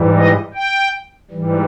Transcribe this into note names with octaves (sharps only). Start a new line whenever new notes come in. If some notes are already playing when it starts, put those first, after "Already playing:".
Already playing: G#2 E3 G3
D#5
G5
G#2 E3 G3